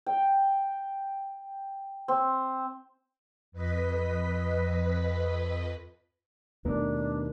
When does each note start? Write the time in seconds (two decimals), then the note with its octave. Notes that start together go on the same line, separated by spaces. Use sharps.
0.06 G5
2.08 C4
3.52 F2 B4 D#5 B6
6.65 D#2 B2 A3 B3 D4 A#4